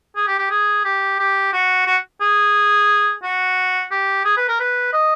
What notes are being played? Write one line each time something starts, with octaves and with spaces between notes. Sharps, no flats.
G#4
G4
G4
G#4
G4
G4
F#4
F#4
G#4
F#4
G4
G#4
B4
A#4
B4
D#5